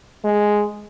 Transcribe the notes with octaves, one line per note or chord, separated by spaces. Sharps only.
G#3